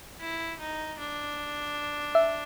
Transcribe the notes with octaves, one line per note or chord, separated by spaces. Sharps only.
E4
D#4
D4
E5